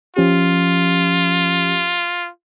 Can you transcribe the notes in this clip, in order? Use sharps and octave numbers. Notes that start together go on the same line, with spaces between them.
F3 C#4 F4 G4